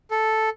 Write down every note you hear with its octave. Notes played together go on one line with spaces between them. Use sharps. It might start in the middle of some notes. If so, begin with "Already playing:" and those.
A4